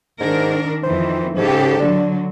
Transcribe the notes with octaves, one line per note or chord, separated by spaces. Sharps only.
G#2 D#3 D4 A#4
F2 D#3 E3 C5
G#2 C#3 G4 A4
D3 F#3 D4